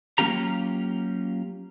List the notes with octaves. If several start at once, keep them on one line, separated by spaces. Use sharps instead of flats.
F#3 A#3 C#4 F4 G4 A#5